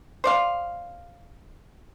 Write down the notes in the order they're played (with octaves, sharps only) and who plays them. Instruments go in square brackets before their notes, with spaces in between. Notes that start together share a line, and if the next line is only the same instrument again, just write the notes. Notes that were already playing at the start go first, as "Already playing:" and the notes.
[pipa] C5 D5 F5